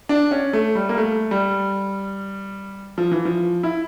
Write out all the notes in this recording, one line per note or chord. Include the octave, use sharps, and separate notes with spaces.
D4
C#4
A3
G3
A#3
A3
G3
F3
E3
F3
E4